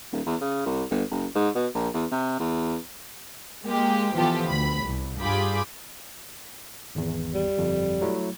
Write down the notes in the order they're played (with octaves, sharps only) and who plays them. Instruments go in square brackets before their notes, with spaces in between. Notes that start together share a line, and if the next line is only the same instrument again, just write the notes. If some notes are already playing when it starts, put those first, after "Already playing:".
[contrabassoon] D#1
E2
C#3
C2
G1
F#1
G#2
B2
A#1
E2
C3
E2
[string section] G#3 A#3 G4
E3 F3 B3 F4 G4 A4
D2 B5
C2
G2 F4 G4 G#4 B5 D6
[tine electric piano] G#1 E2
[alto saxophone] G3
[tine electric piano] G1 F2
F#3 A3 E4